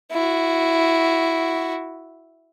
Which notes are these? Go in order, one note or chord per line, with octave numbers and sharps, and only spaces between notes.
E4 F#4